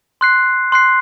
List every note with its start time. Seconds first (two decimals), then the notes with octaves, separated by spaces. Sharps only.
0.21 C6 F#6 C7
0.72 C6 F#6 C7